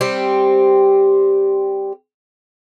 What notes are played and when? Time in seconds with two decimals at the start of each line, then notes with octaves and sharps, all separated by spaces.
0.01 G3 C4 G4